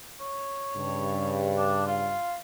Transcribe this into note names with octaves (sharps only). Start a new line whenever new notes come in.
C#5
G2 C#3
D4
F4